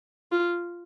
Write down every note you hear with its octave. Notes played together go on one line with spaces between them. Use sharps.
F4